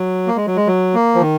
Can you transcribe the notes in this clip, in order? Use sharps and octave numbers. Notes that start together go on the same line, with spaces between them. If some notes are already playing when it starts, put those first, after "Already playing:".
Already playing: F#3
A#3
G#3
F#3
G#3
F#3
A#3
F3
D#3